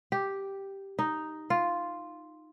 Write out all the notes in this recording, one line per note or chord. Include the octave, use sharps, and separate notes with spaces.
G4
D#4
F4